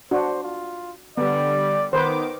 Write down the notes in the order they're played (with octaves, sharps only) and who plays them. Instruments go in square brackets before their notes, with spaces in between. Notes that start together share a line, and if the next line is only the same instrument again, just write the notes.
[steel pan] D4 F#4 [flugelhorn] C5
[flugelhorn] F4
[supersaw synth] D3 G3 [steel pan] B3 [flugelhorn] D5
[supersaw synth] D#3 D6 [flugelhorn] B3 [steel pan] B4 C5